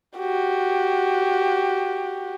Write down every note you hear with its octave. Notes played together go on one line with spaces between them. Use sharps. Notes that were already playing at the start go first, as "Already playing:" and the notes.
F#4 G4